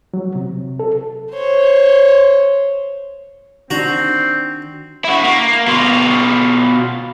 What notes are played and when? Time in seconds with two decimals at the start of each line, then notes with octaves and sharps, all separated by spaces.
0.14 F#3
0.35 C3
0.80 A4
1.32 C5 C#5
3.70 D#3 C4 D4 F#4 A#5
5.04 E4 F#4
5.24 A#3
5.67 B2 F4